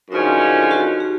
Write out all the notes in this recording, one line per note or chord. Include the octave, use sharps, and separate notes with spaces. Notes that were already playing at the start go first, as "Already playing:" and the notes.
F#2 D3 F3 G#3 C#4 D#4
F4
F#4
G4